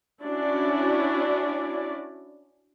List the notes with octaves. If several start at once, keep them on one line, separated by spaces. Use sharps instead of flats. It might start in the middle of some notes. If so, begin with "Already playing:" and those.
C#4 D4 E4 F#4 D5